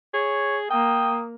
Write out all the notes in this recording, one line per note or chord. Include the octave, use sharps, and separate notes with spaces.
G#4 C#5
A#3 G5 D#6